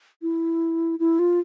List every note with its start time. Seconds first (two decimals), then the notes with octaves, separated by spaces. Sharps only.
0.22 E4
0.99 E4
1.19 F4